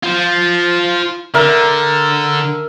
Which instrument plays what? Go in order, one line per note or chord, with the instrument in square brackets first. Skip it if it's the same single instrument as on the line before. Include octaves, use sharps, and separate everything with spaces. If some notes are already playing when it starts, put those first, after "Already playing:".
[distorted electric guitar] F4 C5
[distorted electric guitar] D3 [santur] A#4 E5